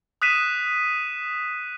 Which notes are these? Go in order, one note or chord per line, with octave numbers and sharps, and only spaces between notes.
D#6 F#6 B6 D#7 E7